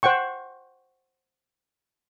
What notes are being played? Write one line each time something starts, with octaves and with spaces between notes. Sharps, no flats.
C5 F#5 G5 C#6